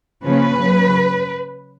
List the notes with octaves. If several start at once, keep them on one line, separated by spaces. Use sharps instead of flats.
C#3 F3 A#3 C#4 B4
C#3 F#3 C#4